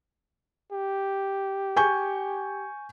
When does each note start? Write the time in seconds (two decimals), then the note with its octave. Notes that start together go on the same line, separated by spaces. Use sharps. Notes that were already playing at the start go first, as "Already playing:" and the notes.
0.72 G4
1.76 G#5 C#6 G6